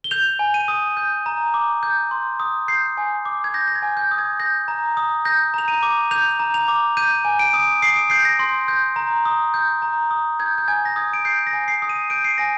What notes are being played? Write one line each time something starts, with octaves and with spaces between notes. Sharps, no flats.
G7
G6 F7
G#5
D#7
D#6
G6
A#5
D6
G6
C6
D#6
G6 C7
G#5
D6
G#6
G6 A#6
A#6
G#6
G#5
G6
D#6
G#6
G6 A#6
A#5
D#6
G6 A#6
A#5 F7
D#7
D6
G6 F7
A#5
F7
D6
G6 D#7
G#5
D7
D#6
D#6 C7
D7
G6 C7
A#6
C6
G6
A#5
D#6
G6
A#5
D#6
G6 G#6
G6
G#5 G#6
A#6
D#6 G#6
D7
G6 C7
A#6
G#5
C7
D#6
D#7
G6 D7
C7
G#5 A#6